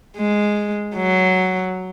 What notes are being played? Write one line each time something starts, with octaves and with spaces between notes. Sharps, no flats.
G#3
F#3